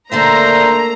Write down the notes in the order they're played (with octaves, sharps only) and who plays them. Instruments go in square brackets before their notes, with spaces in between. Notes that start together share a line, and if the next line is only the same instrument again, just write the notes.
[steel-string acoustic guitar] D3 D4 E5 [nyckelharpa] A3 A#3 [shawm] C5 [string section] A#5